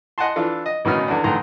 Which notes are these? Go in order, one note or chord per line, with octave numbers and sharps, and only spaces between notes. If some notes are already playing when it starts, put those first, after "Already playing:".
D#5 F#5 G#5 A5 C6
E3 D4 F4 A4
D#5
A1 B2 D#3 C#4 D#4 F6
E2 D3 D4
A1 D3 D#3 A#4 A#5 C6